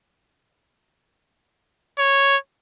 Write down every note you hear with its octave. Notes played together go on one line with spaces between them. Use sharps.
C#5